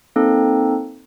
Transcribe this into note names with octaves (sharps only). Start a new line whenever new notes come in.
A#3 C4 D#4 A4